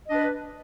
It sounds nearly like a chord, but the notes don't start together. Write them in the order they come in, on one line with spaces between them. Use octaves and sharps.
D#5 D4 B4